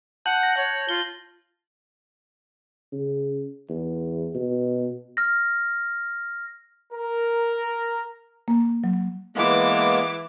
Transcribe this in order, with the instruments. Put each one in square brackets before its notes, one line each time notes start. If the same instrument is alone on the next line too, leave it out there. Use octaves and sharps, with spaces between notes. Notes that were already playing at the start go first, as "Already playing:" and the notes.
[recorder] F#5 [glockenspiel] A5 G6 F#7
[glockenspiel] A#6
[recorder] C#5 [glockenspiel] F#7
[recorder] F4 [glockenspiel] G7
[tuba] C#3
E2
B2
[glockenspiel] F6 A#6
[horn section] A#4
[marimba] A#3
F#3
[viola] E3 D6 [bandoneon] G#3 A#3 B3